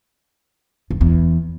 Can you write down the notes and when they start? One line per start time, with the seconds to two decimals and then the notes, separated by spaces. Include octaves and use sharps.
0.90 F#2
1.01 E2